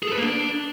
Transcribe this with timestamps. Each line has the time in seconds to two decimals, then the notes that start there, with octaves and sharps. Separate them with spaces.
0.03 G#4
0.08 A4
0.13 B4
0.18 A#3
0.23 D4